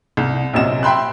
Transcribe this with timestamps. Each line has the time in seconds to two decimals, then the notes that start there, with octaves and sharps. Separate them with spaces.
0.17 C2
0.54 A#1 F#2 C3 D#5 E7
0.83 E5 G5 B5 C6 F#6